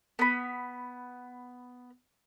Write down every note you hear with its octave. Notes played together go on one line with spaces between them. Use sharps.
B3 B5